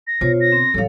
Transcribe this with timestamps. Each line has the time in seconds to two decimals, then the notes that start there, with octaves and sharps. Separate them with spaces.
0.07 A#6
0.21 B2 D3 F4 C5 C#5
0.40 A#6
0.52 C4
0.74 A1 F#3 A4 C#5 F5